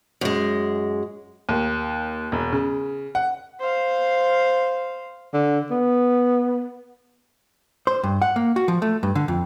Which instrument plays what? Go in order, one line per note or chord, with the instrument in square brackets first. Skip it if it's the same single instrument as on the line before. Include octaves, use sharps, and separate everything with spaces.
[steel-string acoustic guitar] F#2 G#3
[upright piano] D#2
E1
C#3
F#5
[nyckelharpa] C5 F5
[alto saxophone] D3
B3
[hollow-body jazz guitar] C5
G2
F#5
A#3
F#4
F3
A3
G2
D3
F2